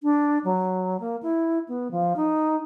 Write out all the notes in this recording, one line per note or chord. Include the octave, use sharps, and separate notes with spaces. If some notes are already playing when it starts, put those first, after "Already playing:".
D4
F#3
A#3
E4
B3
F3
D#4